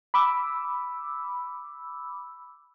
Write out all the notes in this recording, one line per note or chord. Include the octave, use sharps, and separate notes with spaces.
B5 D6 E6